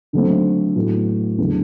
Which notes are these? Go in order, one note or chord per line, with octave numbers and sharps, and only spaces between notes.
D3 F#3 A3 C4
A2 F#3 B3 F#4
E2 D3 F#3